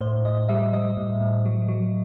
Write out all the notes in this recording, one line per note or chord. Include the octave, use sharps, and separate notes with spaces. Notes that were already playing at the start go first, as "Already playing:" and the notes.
A2 C5
A2 D#5
G3 E5
G3 D#5
A2
A2
F#3
F#3